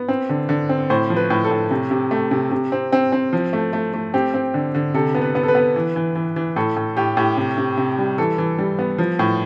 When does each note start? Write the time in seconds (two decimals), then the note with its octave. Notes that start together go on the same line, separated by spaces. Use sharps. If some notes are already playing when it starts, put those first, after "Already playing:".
Already playing: B3
0.08 C4
0.29 D3
0.49 D3
0.69 C4
0.90 A2 C5
1.10 F3
1.17 B4
1.30 A2
1.44 A4
1.51 A2
1.71 C3
1.91 C3
2.11 A3
2.31 C3
2.51 C3
2.72 C4
2.92 C4
3.12 C4
3.33 F3
3.53 A3
3.73 A3
3.94 A3
4.14 C4 G4
4.34 C4
4.54 D3
4.75 D3
4.94 C3 A4
5.15 B3
5.21 B4
5.35 B3
5.43 A4
5.48 B4
5.55 B3
5.76 E3
5.96 E3
6.15 E3
6.36 E3
6.56 A2 A4
6.76 A2
6.97 A2 G4
7.17 A2 G4
7.37 C3
7.58 C3
7.77 C3
7.98 G3
8.18 E3 A4
8.38 E3
8.59 G3
8.79 B3
8.98 F3
9.19 A2